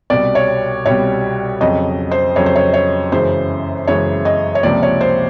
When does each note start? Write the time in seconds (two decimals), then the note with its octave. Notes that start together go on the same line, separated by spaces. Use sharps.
0.10 C2 B2 G3 D5
0.35 C#5
0.86 C2 B2 G3 C#5
1.61 F2 C#3 F#3 D#5
2.11 C5
2.36 F2 C#3 F#3 C#5
2.46 C5
2.56 C#5
2.74 C#5
3.12 F#2 C#3 E3 G#3 C5
3.87 F#2 C#3 E3 G#3 C#5
4.25 D#5
4.55 C#5
4.63 C#2 C3 F3 A#3 D5
4.83 C#5
5.01 C5